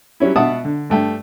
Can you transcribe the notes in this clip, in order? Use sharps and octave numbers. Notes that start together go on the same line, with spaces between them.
F#3 G3 C#4 E4
B2 E5 F#5 A5 D#6
D3
G2 A3 G5